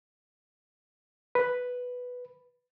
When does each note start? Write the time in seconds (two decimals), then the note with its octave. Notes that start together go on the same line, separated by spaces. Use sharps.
1.35 B4